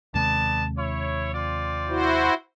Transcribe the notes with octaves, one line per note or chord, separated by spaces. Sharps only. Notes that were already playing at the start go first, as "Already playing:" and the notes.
D#2 C3 G#3 B3 D5 A5
E4 C#5
C4 F4 D5
E4 F#4 C5